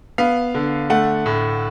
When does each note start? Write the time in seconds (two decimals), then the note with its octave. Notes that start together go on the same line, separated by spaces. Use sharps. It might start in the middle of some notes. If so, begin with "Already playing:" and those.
0.18 B3 F5
0.54 D3
0.90 A3 F#5
1.26 A2